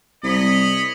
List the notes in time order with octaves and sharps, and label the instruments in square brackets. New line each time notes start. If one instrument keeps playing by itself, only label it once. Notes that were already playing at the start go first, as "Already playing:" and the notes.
[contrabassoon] C2 [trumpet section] C#5 D#5 B5